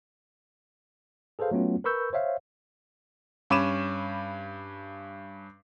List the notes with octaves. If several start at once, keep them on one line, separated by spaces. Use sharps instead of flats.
G#4 A4 B4 C5 F5
F#3 A3 B3 C#4 F4
A#4 B4 B5 C#6 E6 G6
C5 C#5 E5 F5
G2 C#4 B5 D6 D#7 E7